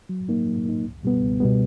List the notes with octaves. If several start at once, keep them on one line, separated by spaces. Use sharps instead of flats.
F#3
A#3 D#4
F#3
A#3 D#4
C#2
B2 G3 B3
C#2
B2 G3 B3